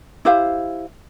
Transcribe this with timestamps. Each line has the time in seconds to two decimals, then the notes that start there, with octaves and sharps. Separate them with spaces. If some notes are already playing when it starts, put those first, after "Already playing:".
0.25 E4 G4 C5 F5